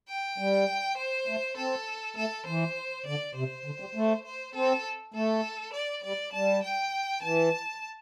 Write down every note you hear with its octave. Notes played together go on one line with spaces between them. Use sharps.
G5
G3
C5
A3
C4 A4
A3 A4
E3 C5
D3 D5
C3 C5
D3
G3
A3
C5
C4 A4
A3 A4
D5
G3 D5
G3 A5
G5
E3 A5